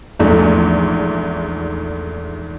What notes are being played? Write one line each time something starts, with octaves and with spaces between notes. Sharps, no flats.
A#1 E2 G#2 A3